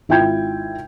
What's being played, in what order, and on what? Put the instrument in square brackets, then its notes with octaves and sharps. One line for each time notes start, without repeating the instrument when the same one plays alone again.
[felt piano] G#1 E4 F4 G5 G6 G#6